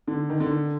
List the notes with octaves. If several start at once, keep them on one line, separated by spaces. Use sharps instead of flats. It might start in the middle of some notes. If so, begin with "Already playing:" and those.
D3
D#3
D3